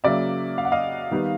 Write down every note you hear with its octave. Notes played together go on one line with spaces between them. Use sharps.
C#3 F#3 A#3 D5 E5
F5
F#5
D#5 F5
D#3 G3 B3